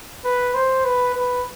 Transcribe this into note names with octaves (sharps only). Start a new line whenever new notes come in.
B4
C5
B4
B4